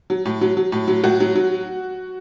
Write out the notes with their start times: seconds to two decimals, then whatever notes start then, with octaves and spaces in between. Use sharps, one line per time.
0.10 F#3
0.26 A2
0.41 F#3
0.57 F#3
0.72 A2
0.88 F#3
1.04 A2 F#4
1.20 F#3
1.35 F#3